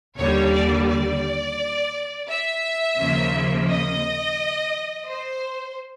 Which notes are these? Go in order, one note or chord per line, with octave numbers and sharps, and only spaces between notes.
D#2 D3 G3 C#5
D5
D5
E5
D#2 C#3 F3 A#3
D#5
C5